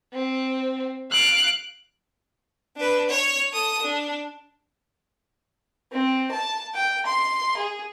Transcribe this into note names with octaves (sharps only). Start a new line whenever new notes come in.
C4
F5 F#6 D7
D4 B4
C#5
A4 D#6
D4
C4
A5
G5
C6
G#4